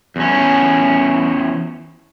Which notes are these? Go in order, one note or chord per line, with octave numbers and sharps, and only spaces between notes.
E2 C#4